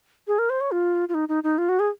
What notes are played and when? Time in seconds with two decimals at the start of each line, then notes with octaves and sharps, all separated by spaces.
0.27 G#4
0.39 A#4
0.50 C5
0.61 C#5
0.71 F4
1.09 F4
1.14 D#4
1.29 D#4
1.44 D#4
1.58 F4
1.69 F#4
1.79 G#4